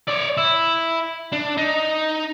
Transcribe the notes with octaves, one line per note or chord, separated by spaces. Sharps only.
C#5 D5
E4
D4
D#4